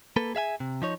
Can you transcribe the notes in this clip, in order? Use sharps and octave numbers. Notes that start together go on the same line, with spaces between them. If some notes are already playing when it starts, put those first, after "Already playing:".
A#3 A4 B4
G#4 E5 F5 G#5
C3
F3 D#4 C#5